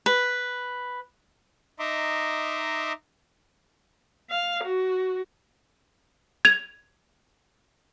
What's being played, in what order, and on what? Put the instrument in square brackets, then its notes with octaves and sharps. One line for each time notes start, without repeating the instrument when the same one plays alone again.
[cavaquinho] B4
[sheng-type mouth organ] D#4 D#5 E5 A#5 C6 D6
[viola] F5
F#4
[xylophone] G#6 F7